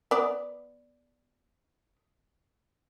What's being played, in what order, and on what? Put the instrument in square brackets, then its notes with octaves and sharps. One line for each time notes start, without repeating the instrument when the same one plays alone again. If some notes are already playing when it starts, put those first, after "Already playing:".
[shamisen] B3 D5